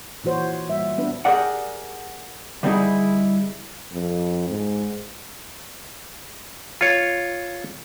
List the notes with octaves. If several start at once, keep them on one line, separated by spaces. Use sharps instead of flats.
A#2 E3 F#4 C5 C#5
A#2 G3 E5
B3 D4 B4
G4 G#4 A#4 D5 F#5
D3 G3 C4 D#4 E4 G#4
F2
G#2
F4 C#5